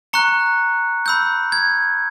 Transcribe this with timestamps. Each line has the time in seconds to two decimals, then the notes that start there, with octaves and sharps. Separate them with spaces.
0.13 A#5 C#6 F#6 C#7
1.06 B5 E6 G6
1.52 G#6